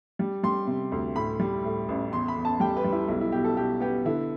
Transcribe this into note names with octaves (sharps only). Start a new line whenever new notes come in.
G3
G3 C6
C3
D2
A2 B5
G3
A2
A1
E2 C6
B5
E2
A5
G3 G5
B4
G3
E4
B1 E4
E4
B2 G4
A4
B2 G4
B3 G4
D3 E4